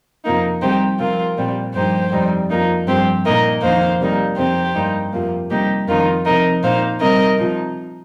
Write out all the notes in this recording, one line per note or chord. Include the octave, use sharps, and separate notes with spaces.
F2 C3 F3 A#3 D#4
C3 G3 C4 D#4 G4 C5
C3 F3 C4 F4 A#4
A#2 G3 C4
G2 F3 A#3 D#4 G4 C5
F2 C3 G3 C4 D#4
F2 F3 A#3 D#4
G2 F3 C4 G4 C5
A#2 A#3 D#4 A#4 D#5
F2 D#3 A#3 D#4 C5 F5
C3 G3 A#3 D#4
F2 C3 F3 C4 D#4 G4 C5
G2 G3 A#3 D#4
F2 C3 F3 A#3
C3 G3 A#3 D#4 G4
F2 D#3 C4 D#4 F4 A#4
C3 F3 C4 D#4 A#4 D#5
A#2 A#3 D#4 C5 F5
C3 G3 C4 D#4 A#4 D#5
C3 F3 D#4